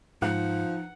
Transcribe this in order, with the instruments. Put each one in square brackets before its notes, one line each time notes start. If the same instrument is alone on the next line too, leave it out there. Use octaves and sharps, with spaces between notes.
[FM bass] G#2 [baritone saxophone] F3 [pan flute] D#4 [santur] F#5